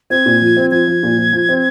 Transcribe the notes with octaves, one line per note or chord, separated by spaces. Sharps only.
C4 G#6
A#2
F3
C4
F3 G#6
F3
A#2
F3
F3
C4